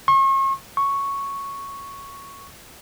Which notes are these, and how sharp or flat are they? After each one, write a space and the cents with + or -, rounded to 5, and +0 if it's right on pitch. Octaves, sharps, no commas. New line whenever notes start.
C#6 -40
C#6 +0